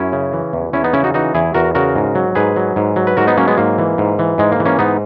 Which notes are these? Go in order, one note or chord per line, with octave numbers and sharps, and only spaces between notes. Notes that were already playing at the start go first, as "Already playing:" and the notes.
Already playing: F#2 C#4 E4
C#3
E3
E2
E2 C#4 E4
B3 D#4
C#3 C#4 E4
D#4 F#4
E3 D#4 F#4
E2 E4 G#4
E2 F#4 A#4
C#3 F#4 A#4
G#2
F#3
G#2 G#4 B4
F#3
G#2
F#3
B4
G#2 F#4 A#4
B3 D#4
F#3 A#3 C#4
G#3 B3
G#2 A#3
E3
G#2
E3
G#2 G#3
A#3
E3
A#3 C#4
G#2 B3 D#4